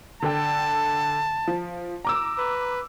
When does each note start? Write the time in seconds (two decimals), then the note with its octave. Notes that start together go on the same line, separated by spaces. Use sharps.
0.22 D3 A4 G5 A5
1.47 F3
2.05 A#5 D6 E6
2.38 B4